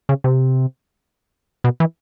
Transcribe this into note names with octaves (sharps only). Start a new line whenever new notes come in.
C#3
C3
B2
E3